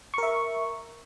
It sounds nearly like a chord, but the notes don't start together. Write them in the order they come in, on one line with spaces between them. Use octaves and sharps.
C#6 A#4 E5